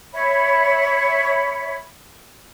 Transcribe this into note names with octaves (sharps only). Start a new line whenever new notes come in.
C#5 E5 B5